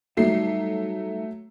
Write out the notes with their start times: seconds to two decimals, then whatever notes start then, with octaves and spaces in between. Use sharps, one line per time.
0.17 F#3 G3 A3 D#4 E5 C7